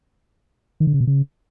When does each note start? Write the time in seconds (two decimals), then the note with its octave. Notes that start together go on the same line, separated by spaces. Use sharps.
0.80 D#3
0.87 D3
0.94 C#3
1.01 B2
1.07 C#3